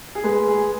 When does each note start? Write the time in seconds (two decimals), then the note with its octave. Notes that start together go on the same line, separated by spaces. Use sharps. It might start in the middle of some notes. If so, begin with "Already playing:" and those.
0.15 G#4
0.24 G#3 B4
0.48 G#4